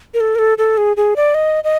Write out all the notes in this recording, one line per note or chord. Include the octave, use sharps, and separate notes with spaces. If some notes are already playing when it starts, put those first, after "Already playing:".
A#4
A4
A#4
A4
A4
G#4
G#4
D5
D#5
D#5